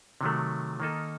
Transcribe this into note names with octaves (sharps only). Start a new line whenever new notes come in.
C3 D#3 F#3 A3
D#3 A#3 D#4 A4